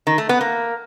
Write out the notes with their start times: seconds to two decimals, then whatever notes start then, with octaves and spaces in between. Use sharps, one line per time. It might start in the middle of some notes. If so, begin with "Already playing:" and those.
0.07 D#3
0.18 A3
0.29 B3
0.41 A#3